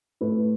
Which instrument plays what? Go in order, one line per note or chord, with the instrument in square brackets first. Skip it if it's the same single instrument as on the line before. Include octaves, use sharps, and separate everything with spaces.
[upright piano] A2 A3 E4 B4